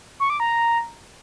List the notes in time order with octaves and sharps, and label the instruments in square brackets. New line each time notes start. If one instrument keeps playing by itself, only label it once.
[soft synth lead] C#6
D6
A#5